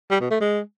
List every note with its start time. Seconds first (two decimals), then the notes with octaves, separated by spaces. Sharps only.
0.10 G3
0.21 B2
0.31 A3
0.41 G#3